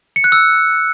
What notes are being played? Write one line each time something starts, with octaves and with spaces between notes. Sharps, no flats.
C#7
F#6
E6